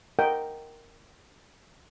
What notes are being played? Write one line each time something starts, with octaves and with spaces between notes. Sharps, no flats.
A#4 D#5 F#5 G5